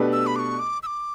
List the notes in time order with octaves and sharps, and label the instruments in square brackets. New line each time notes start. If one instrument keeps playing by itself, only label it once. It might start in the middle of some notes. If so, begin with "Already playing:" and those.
Already playing: [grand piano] B2 A3 D4 G4 B4
[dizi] E6
B5
D6
C#6
D6
E6
D6